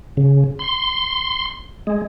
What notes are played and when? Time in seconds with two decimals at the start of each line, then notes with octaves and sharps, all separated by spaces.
0.17 C#3
0.59 C6
1.87 G#3